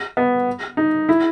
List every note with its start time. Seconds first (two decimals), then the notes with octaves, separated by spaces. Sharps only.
0.17 B3
0.77 D#4
1.09 E4